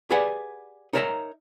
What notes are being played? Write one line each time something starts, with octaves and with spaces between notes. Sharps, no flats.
G4 G#4 B4 D5 F#5 G#5
D#4 A#4 C#5 D5 E5 A#5